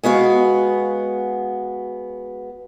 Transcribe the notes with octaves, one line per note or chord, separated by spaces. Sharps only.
G#3 B3 F#4 F5